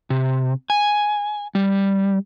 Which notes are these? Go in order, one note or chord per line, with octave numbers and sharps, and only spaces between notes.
C3
G#5
G3